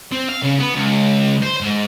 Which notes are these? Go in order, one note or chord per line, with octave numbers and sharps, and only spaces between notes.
C4
F5
C#3
B3
C#2
C5
G#2